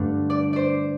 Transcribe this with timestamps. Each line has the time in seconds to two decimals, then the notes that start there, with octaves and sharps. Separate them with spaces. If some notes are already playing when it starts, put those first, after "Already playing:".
Already playing: G2 D3 A3 D4
0.30 D5
0.53 C5 D5